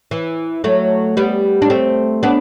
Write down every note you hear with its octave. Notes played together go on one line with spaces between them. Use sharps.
E3
F#3 A3
G3 B3
D4
A3 C4
B3 D4